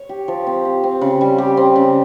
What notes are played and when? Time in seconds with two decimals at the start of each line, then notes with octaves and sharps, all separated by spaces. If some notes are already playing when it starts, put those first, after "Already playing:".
Already playing: C#5
0.09 G4
0.28 F3
0.47 C4
0.65 G4
0.83 C4
1.01 C#3
1.21 G3
1.38 G4
1.57 C4
1.76 C#3